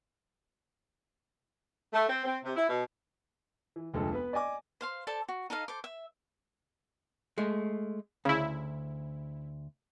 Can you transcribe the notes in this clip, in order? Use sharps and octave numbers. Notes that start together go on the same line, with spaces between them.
A3
C4
C4
C3
E4
B2
E3
F1 D2 F3 G#3 A4
B3 B4
D5 D#5 G#5 D6
C5 F5 C6
A4 C5 D5 A5
F#4
D#4 A4 D#5 F5
A4 C5 D6
E5
G#3 A3
D2 C#3 E4